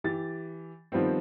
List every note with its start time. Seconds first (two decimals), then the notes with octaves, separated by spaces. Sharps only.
0.04 E3 G4 A6
0.92 D#3 F3 G3 B3 C4